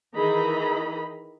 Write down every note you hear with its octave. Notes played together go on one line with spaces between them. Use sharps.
D#3 E3 G#4 D#5 A#5 B5